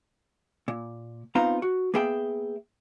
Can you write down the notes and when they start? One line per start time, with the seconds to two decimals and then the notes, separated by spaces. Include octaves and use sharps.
0.68 A#2
1.35 B3 C4 D#4 F4 F5 A#5
1.62 F#4
1.94 A#3 B3 G#4 E5 G5